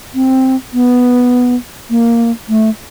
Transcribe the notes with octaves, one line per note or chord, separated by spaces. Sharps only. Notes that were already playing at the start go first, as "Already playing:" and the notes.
C4
B3
A#3
A3